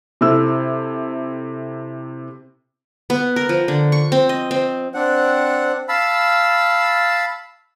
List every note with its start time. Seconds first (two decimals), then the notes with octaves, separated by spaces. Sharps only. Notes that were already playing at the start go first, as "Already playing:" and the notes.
0.21 C3 E4 A4 E6
3.10 B3
3.36 A#4
3.49 F3
3.68 D3
3.92 C#6
4.12 C4
4.29 D#5
4.51 C4
4.94 C4 D4 F#5
5.89 F5 A5 B5 E6